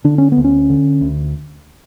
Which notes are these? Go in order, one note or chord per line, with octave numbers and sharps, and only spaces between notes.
D3 D4
C#4
B3
D2
C#4
D3
D2